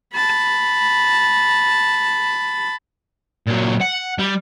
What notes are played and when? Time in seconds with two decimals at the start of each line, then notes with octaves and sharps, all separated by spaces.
0.14 A5 B5
3.47 A#2 F#3
3.81 F#5
4.19 G3